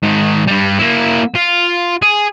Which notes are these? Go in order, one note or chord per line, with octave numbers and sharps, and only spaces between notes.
G#2 D#3
G2 G3
A#3 E4
F4
G#4